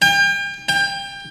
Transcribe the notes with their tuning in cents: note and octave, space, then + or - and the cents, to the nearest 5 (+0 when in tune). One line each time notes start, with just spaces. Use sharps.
G5 +35
G5 +25